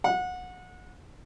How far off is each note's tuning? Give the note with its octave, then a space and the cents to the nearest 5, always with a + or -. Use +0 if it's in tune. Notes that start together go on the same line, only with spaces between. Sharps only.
F#5 -25